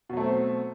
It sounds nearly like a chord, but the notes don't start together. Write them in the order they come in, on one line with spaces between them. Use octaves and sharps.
B2 F#3 A3 C4